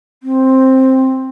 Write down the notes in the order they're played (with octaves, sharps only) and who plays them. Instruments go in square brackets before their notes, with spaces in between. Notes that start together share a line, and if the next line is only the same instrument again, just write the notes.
[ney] C4